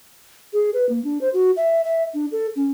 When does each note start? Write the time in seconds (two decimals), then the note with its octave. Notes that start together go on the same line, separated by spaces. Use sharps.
0.53 G#4
0.74 B4
0.89 A#3
1.04 D4
1.21 C5
1.34 F#4
1.57 E5
1.84 E5
2.14 D4
2.32 A4
2.56 C#4